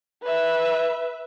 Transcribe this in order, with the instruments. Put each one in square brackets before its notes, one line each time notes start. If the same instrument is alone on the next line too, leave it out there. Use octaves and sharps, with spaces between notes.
[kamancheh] B4 E5